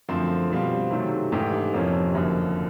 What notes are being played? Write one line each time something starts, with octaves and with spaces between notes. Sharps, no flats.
F#2 D3 F3 A3 C4
B2 G3 C4 F4
C3 D#3 F#3 A3
G#2 E3 A3 D4 G4
F2 C3 F3 A#3 C#4
F#1 F#2 D3 F3